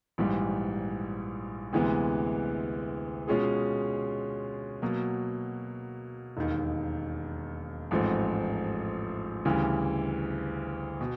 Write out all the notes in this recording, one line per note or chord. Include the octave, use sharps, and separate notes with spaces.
A#1 G#2 E3 G3
D2 C3 E3 G#3 B3
B2 G#3 C#4 F4 G#4
B2 F#3 A#3
E1 D#2 D#3
A1 G#2 F3 A3 C4
D2 C#3 E3 G3
B2